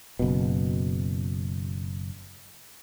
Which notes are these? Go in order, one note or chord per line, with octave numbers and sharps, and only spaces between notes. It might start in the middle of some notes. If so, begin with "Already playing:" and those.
F#1 B2